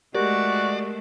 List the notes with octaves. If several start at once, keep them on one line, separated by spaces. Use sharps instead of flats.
G#3 A3 F#4 G4 A#4 D5